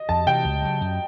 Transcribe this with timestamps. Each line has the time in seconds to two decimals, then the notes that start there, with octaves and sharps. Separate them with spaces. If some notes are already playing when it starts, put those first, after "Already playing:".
Already playing: D#5
0.09 F2 A5
0.27 C3 E3 G5
0.45 C#2
0.62 C#3 F#3
0.81 F#2